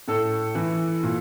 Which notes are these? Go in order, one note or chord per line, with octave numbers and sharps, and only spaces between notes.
A2 A4
E3
A#2